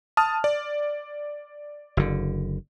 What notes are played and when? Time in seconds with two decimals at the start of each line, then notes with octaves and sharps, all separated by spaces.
0.17 A5 D#6 F6
0.44 D5
1.97 F#1 D3